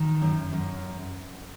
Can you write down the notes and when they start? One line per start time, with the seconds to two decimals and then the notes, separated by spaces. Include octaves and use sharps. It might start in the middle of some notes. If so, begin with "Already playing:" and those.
Already playing: D#3
0.22 F#2
0.53 F#2